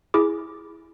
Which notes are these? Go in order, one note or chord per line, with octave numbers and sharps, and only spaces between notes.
E4 G#4 D6